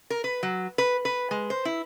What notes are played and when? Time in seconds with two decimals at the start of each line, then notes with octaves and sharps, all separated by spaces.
0.10 A#4
0.24 B4
0.43 F#3
0.78 B4
1.05 B4
1.31 G#3
1.50 C5
1.65 E4